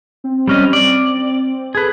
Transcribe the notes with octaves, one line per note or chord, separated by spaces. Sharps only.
C4
G3 C#4 D#5
D5
G#4 A4 B4